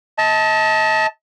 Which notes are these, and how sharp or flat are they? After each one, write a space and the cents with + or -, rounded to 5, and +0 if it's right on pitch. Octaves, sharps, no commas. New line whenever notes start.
D#5 +35 A5 +0